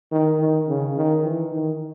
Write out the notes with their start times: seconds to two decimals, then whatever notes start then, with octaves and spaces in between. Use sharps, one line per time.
0.12 D#3
0.40 D#3
0.68 C#3
0.96 D#3
1.23 E3
1.52 D#3